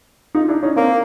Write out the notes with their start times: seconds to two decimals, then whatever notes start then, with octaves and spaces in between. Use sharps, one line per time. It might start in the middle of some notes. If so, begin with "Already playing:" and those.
0.35 D#4 F4
0.48 D4 E4
0.63 C#4 D#4
0.76 A#3 C4 D4